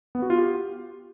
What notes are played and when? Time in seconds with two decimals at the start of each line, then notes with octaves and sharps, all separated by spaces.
0.15 B3
0.22 F#4
0.30 F4
0.38 G4